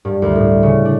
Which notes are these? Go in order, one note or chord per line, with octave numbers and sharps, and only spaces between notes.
G2
D2
A2
C#3
D4